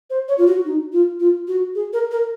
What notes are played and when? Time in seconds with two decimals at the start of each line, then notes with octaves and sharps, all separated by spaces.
0.10 C5
0.28 C#5
0.38 F4
0.47 F#4
0.65 D#4
0.93 F4
1.20 F4
1.48 F#4
1.75 G#4
1.93 A#4
2.11 A#4